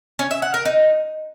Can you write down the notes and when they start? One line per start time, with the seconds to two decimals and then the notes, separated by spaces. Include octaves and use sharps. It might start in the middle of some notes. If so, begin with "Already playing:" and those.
0.19 C#4
0.31 E5
0.42 F#5
0.54 A#4
0.65 D#4